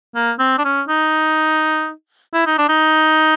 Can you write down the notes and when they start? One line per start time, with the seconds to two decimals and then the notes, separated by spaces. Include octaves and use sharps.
0.15 A#3
0.39 C4
0.58 D4
0.64 C#4
0.88 D#4
2.34 E4
2.46 D#4
2.58 D4
2.69 D#4